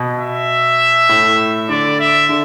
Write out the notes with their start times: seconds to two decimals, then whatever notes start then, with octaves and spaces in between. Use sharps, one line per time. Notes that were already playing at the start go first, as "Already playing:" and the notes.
Already playing: B2
0.18 E5
1.09 A2
1.69 D3 D5
2.00 E5
2.29 D3